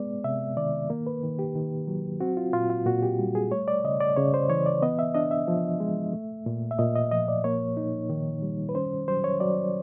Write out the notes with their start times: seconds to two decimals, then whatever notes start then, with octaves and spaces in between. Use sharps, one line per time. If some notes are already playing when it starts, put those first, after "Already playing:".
Already playing: G#3 B3 D5
0.24 C3 E5
0.57 D#3 D5
0.90 A#3
1.07 B4
1.23 D#3
1.39 G4
1.55 D#3
1.87 F#3
2.20 C4 F#4
2.37 F4
2.53 A#2 F4
2.70 F4
2.86 A#2 F#4
3.03 G4
3.19 G3
3.35 G#4
3.51 A3 C#5
3.68 D5
3.84 C#3 D#5
4.00 D5
4.17 C#3 C#5
4.34 C5
4.49 E3 C#5
4.66 D5
4.82 B3 D#5
4.99 E5
5.15 D4 D#5
5.31 E5
5.48 F3
5.80 G#3
6.13 A3
6.46 A#2
6.71 E5
6.79 A#2 D#5
6.95 D#5
7.11 F3 D#5
7.28 D5
7.44 A#3 C#5
7.77 D#4
8.10 D#3
8.42 G3
8.69 B4
8.75 C#4 C5
9.08 F#3 C5
9.24 C#5
9.40 F#3 D5